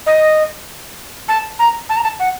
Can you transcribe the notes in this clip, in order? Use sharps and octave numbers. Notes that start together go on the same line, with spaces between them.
D#5
A5
A#5
A5
A#5
A5
F#5